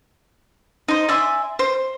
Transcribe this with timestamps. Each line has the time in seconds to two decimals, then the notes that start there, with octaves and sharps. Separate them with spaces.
0.88 D#4 C5
1.09 D5 E5 G#5 C6
1.59 C5